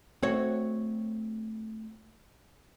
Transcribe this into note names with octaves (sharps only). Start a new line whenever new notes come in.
A3 C4 F#4 C#5